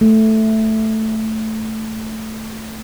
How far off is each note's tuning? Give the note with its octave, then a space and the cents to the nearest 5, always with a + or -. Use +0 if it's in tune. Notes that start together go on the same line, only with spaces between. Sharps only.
A3 +0